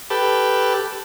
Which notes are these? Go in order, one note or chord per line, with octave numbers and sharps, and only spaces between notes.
G4 A4 B4